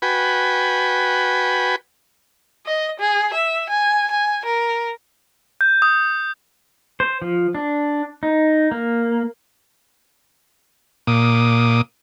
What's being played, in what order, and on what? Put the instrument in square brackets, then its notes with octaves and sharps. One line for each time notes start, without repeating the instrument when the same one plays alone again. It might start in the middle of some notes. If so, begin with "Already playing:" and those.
[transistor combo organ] F#4 B4 G5 G#5 B5
[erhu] D#5
G#4
E5
G#5
G#5
A#4
[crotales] G6
D#6
[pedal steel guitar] C5
F3
D4
D#4
A#3
[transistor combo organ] A#2 D6 D#6